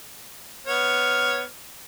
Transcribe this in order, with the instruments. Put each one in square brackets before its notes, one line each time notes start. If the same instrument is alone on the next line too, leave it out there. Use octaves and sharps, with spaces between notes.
[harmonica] B3 C#5 F6